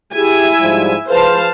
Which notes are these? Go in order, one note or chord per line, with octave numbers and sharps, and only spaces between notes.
E4 G4 G#4 E5 G#5
G#2 F3 G3
F3 G#4 B4 C5 F5 A5